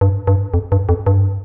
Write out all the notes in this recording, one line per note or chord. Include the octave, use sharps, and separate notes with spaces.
G2
G2
F2
G2
F2
G2